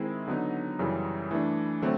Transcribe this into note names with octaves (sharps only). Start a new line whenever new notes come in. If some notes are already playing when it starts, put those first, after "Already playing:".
Already playing: D#3 G#3 C4 E4
D3 F#3 B3 D#4
F#2 C#3 E3 G3
E3 A3 D4
D3 F#3 A3 C4